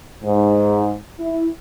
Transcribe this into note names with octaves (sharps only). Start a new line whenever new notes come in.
G#2
E4